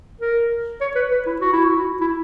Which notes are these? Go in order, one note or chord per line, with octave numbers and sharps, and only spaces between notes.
A#4
C#5
B4
B4
E4
F#4
E4
F#4
E4